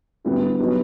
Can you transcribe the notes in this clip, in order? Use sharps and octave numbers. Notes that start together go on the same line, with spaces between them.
D3 G3 B3 E4 G4
F#3 B3 D#4 G4